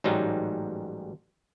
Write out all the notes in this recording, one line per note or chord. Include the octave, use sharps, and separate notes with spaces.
A1 G#2 F#3 G3 D#4